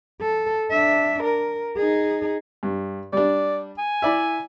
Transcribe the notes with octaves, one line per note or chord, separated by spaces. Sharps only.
A4
D4 E5
A#4
D#4 G#4
G2
G3 D4 D5
G#5
E4 D5 E5